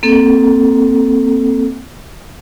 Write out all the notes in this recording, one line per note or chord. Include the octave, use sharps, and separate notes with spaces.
A#3 C4 A4